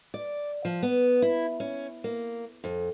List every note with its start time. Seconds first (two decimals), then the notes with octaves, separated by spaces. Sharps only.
0.14 D5
0.65 F3
0.83 B3
1.22 E4
1.60 C#4
2.04 A#3
2.64 F2